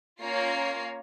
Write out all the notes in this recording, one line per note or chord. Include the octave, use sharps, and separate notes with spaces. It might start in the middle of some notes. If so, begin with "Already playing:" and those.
A#3 C#4 F4 C#5 A#5 C7